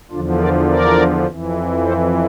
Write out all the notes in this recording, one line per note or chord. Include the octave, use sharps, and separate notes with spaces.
E2 D3 F3 D4 F4
A#4 D5
A#4 D5
F2 E3
A4 C5